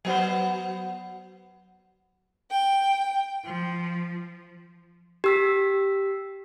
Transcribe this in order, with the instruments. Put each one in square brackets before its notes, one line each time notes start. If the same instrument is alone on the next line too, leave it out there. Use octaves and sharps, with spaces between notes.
[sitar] F#3 B3 C5
[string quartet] G5
F3
[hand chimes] G4 E6 B6